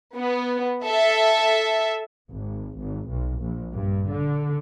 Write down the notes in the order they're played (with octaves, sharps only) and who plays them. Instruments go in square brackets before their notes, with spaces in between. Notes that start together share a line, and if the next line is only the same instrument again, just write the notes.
[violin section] B3
A4 E5
[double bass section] G#1
G#1
B1
A#1
G2
D3